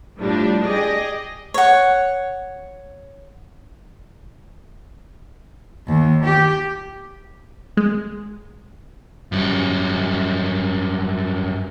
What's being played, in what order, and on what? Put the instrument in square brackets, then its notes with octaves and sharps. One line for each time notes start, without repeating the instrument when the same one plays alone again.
[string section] A2 F3 G3 D4
G4 G#4 D5 D#5
[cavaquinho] C#5 F#5
[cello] D#2
G4
[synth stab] G#3
[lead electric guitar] F#2 G3